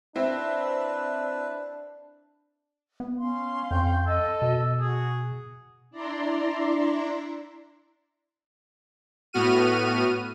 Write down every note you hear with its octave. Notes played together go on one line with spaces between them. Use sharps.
C4 D4 E4 B4
B3
C#4 F5 C6
F2 G5
A4 D#5 A5
B2
F#4 G#4
D4 E4 D5 A#5 C6
A2 B3 F#4 F6 D#7